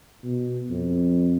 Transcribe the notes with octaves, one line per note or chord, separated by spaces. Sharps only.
B2
F2